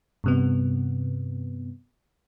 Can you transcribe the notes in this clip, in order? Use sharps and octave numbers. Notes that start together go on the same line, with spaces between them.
G2 C3 B3